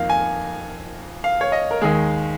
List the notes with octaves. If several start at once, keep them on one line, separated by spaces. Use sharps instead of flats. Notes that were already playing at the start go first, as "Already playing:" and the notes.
Already playing: F2 D#3 A#3 F5
G#5
F5
C#5
D#5
A#4
D#2 D#3 G#3 G#4